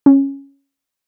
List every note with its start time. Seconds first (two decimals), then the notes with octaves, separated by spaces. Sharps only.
0.06 C#4